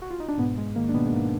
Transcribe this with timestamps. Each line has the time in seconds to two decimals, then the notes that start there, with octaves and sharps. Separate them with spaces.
0.02 F#4
0.10 F4
0.20 D#4
0.28 D4
0.38 G#2 B2 B3
0.57 G#2 G#3
0.75 D#3 A#3
0.89 D4
0.94 B2 D#3 B3
1.06 G#3
1.12 G#2 A#3